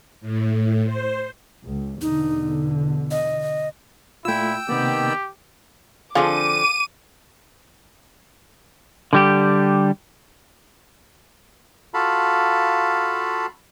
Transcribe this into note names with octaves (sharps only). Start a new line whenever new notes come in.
A2
C5
C#2
E2 B2 D3 D#4
D#5
A#2 A3 E4 F4 G5 E6
C3 D#3 A#3 B3 G4 D5
D3 F3 C4 F4 G#4 D6 D#7
D3 G3 G4
F4 F#4 A4 F5 A5 B5